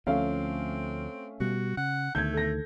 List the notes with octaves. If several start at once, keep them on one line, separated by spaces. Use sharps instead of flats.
D2 F3 A3 C4 C#4 F5
B2 G3 F#4
C#3 F#5
D2 D#3 A3 G6 G#6
A4 A#6